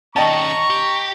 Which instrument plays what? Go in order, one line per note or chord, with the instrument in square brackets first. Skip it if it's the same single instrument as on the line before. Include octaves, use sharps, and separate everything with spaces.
[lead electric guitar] D#3 C#4 [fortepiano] D#5 G5 A5 [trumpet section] A#5 C#6
[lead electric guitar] G4